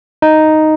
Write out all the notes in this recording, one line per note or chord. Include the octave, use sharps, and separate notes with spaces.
D#4